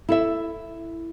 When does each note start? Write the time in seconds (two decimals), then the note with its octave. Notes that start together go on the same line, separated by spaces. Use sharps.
0.09 E4 A4 E5